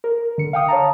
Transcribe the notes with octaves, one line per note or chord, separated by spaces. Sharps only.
A#4
D3 C#7
F5 G5 D#6
C#5 F5 A5 A#5